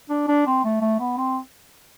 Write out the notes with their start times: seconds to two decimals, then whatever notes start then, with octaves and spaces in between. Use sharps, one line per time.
0.10 D4
0.28 D4
0.47 C4
0.65 A3
0.81 A3
1.00 B3
1.17 C4